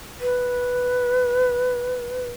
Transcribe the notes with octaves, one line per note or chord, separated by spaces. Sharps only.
B4